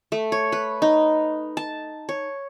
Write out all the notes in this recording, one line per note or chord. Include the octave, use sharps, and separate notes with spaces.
A3
C#5
B4
D#4
A5
C#5